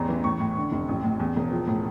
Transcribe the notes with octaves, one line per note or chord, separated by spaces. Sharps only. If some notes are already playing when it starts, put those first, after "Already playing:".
Already playing: A1 E2 A#5
E3
A2 C#6
A2
D3
F1
A1
A2
E2
E1
F3
A2